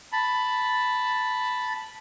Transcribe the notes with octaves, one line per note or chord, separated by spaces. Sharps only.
A5 B5